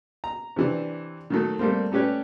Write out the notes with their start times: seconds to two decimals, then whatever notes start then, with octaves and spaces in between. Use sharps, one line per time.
0.24 A#5
0.56 C3 E3 D4
1.30 D#3 F#3 A3
1.59 G3 A3 A#3 C4
1.92 A3 C#4 G4 B4 C#5 D5